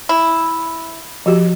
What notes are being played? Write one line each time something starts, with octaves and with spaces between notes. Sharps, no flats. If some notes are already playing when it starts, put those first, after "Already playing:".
E4
F3 F#4 G4